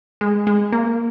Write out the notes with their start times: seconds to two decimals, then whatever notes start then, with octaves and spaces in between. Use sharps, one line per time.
0.21 G#3
0.47 G#3
0.73 A#3